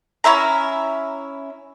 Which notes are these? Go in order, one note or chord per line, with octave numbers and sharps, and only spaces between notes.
C#4 E4 E5 A#5